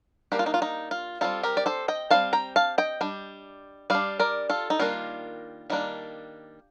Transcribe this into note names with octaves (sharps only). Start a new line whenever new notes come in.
G3 A#3 D4 G4
F4
D#4
F4
D#4
F4
G3 C4 D#4 F4 A4
G4 A#4
D5
A4 C5
D#5 G5
G3 C4 F5 A5
G5 A#5
F5 A5
D#5 G5
G3 D4
G3 D4 D5 F5
A#4 D5
F4 A4
D#4
D#3 G3 A#3 D4 F4
D#3 G3 A#3 D4